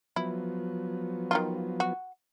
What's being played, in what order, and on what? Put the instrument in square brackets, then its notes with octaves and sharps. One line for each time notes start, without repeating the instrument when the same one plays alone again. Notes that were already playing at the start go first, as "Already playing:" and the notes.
[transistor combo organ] F3 F#3 B3 [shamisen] E4
[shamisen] D#3 D#4 F4
F#4